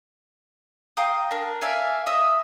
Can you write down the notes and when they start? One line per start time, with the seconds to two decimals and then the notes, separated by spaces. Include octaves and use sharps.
0.97 F5 G5 A#5 D#6
1.31 D4 A#4
1.61 D5 E5 F5 G#5
2.06 D#5 E5 B5 D#6